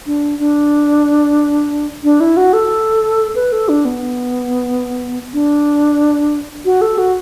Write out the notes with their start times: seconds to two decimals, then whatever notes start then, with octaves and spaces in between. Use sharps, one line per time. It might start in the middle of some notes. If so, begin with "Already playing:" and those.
0.06 D4
0.39 D4
2.04 D4
2.20 E4
2.37 F#4
2.53 A4
3.35 B4
3.52 A4
3.69 D4
3.85 B3
5.33 D4
6.65 F#4
6.81 A4
6.98 F#4